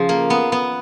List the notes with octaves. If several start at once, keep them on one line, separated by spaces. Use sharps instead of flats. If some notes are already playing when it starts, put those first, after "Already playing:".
Already playing: C#3 F3
A#3
B3
B3